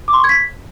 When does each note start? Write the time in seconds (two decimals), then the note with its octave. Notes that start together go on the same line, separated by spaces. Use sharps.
0.08 D6
0.13 C6
0.19 C#6
0.24 G#6
0.29 B6